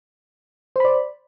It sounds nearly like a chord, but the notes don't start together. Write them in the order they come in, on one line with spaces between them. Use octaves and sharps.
C5 B5 D5